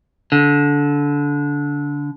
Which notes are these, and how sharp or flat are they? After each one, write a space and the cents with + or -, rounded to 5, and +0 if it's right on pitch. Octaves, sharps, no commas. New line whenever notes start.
D3 -20